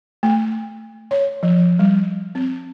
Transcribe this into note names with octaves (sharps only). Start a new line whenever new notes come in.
A3
C#5
F3
G3
C4